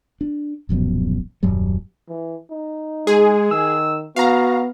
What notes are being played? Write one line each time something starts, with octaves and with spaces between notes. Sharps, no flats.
D4
D1 A#1 F#2 B2
D#1 F#2 F#3 G3
E3
D#4
G#3 G#4
D#3 E6
B3 F#4 F5 A#5